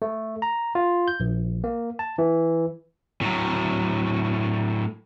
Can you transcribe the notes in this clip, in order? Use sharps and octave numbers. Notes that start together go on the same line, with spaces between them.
A3
A#5
F4
G6
A#1
A#3
A5
E3
A2 F#3